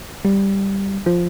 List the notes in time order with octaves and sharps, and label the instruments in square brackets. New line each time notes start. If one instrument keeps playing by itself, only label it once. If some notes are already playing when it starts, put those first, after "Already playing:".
[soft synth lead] G3
F3